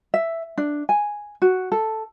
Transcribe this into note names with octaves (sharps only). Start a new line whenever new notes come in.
E5
D4
G#5
F#4
A4